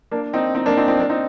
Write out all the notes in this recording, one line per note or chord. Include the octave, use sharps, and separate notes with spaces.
A#3 D4
C4 D#4
C4 D#4
A#3 D4
C4 D#4
C4 D#4
A#3 D4
C4 D#4